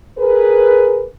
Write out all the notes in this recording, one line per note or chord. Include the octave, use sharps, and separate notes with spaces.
G#4 A#4 B4